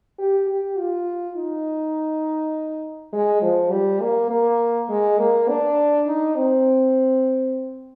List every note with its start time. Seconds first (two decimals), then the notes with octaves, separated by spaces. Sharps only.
0.19 G4
0.49 G4
0.78 F4
1.36 D#4
3.13 G#3
3.42 F3
3.72 G3
4.01 A#3
4.30 A#3
4.89 G#3
5.19 A#3
5.49 D4
6.07 D#4
6.35 C4